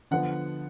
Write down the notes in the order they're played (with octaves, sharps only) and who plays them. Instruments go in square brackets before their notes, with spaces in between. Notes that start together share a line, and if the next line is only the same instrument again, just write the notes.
[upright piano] D3 F3 B3 F#5